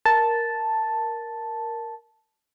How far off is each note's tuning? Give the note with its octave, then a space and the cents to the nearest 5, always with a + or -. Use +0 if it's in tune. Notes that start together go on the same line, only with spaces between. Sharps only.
A#4 +0 A5 +0